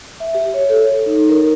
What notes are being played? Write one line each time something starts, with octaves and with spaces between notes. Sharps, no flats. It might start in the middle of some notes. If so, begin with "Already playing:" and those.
E5
G4
C#5
A4
D#4
A#4